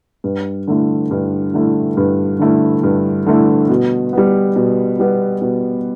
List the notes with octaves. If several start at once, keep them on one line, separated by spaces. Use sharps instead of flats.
G2
D3 A3 E4
G2
D3 A3 E4
G2
D3 A3 E4
G2
D3 A3 E4
B2
G3 B3
B2
G3 B3
B2